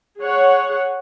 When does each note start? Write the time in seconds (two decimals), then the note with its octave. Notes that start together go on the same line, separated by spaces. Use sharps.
0.18 G#4 C#5 F#5